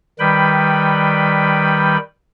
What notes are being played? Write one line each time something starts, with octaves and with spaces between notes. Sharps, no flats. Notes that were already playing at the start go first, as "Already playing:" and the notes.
D#3 G3 B4 G5 B5